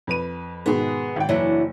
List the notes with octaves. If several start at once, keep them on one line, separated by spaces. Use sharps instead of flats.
F2 B4 D#7
G#2 B2 D#3 B3 G#4
G#1 G5
F#1 E3 F#3 D4